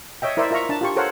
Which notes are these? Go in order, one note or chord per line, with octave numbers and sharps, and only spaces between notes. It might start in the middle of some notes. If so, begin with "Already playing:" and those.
C#5 D#5 E5 G5
E4 A#4 C5 D5 E5
F4 A#4 E5 A#5 C#6
D4 A5
F4 G4 C#6
A4 A#4 C5 C#5 F5 F#5